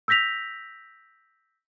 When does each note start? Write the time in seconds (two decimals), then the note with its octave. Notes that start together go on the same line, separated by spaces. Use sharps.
0.08 E6 G6 A#6 B6 F7